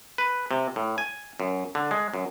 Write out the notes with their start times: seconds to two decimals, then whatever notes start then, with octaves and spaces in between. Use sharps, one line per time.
0.18 B4
0.51 C3
0.76 A2
0.98 G#5
1.40 F#2
1.75 D3
1.91 G#3
2.14 F#2